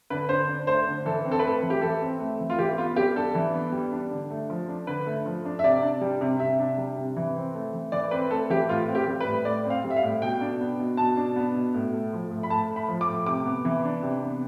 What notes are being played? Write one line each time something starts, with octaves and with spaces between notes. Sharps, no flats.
D3 B4
D3 C5
D4
A3 C5
D3
E3 A4
C4
A4
B4
A3 A4
E3
G4
E3 A4
C4
A3
E3
F4
E3 G4
B3 F4
G3 G4
D4 A4
E3
B3
G3
D4
D3
A3
F3
D4
D3 B4
A3
F3
D4
E5
C3 D5
D4
G3
C3
C3 E5
D4
G3
C3
E3
C4
A3
E3
E3 D5
C4 B4
A3 A4
E3 G4
A2 F4
C4
G4
G3
B4
A2
A2 D5
C4
F5
G3
E5
F5
A2
B2 G5
D4
B3
B2
B2 A5
D4
B3
B2
A2
A3
F3
A2
B5
A2 A5
A3
B5
F3
D6
A2
C3 D6
B3
E3
D4
C3
B3